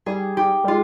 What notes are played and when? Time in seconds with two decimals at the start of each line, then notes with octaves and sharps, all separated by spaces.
0.06 G3 G#4
0.37 G4
0.64 G3
0.68 G#3 F4